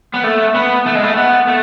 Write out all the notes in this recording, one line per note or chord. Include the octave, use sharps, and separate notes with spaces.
B3
A3
B3
A3
G#3
A3
B3
A3